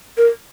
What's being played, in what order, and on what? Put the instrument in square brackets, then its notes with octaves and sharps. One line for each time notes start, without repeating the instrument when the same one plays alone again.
[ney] A#4